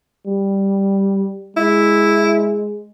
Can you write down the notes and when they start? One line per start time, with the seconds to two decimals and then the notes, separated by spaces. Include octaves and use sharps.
0.27 G3
1.56 G#3 E4